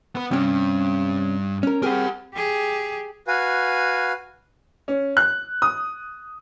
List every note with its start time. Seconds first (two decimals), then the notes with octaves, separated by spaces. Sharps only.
0.15 B3 B4
0.31 G2 C3 C#4 G4
1.63 C#4 A#4
1.83 C4 G4 G#4 A#4 F#5
2.34 G4 G#4
3.28 F#4 B4 F5 G#5
4.88 C#4
5.17 F#6
5.62 D#6